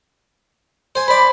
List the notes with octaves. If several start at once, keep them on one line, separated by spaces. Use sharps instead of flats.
C5 G#5
C5 D5 B5